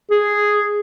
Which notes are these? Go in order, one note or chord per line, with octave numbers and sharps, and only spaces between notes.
G#4